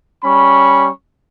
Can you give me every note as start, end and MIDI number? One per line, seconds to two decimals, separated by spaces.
0.24 0.89 55
0.24 0.89 61
0.24 0.89 83
0.24 0.89 85